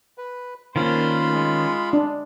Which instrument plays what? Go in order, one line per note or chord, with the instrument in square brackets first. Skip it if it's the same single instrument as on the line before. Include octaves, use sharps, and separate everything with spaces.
[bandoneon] B4
[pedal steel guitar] D#3 C#4 D4 [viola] A#3 C5 [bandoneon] F4 B5
[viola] G#3
[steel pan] D4